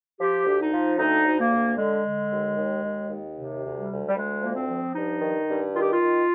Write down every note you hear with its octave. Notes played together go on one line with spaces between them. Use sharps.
F3 G4
D2
D#4
F3
D2 D#4
D2
A#3
D2
D3 G#3
D3
D#2
D#2
D#2
D#2
C3
D2
G3
D2
G3
D2 G#3
F3 A#3
C4
F3
G2 D#4
D#3
G2
D#3 F4
G4
F4
D#3